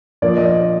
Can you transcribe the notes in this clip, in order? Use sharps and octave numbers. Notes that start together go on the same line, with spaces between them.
A#2 F3 A#3 D5
D#5
D5